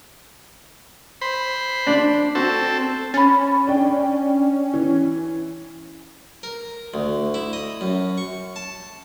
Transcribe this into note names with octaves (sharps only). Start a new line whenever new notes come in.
C5 B5
D4
C4 F#4 A4
C#4 B5 A6
D4 G5
E3
A#4
D2
E4
D#5
F#2
C#6
A5